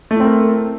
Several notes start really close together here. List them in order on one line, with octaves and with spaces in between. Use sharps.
A3 E4 C4 A#4